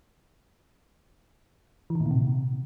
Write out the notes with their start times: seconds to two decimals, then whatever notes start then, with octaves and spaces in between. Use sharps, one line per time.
1.90 E3
1.95 D#3
2.00 A2
2.06 A#2
2.11 C3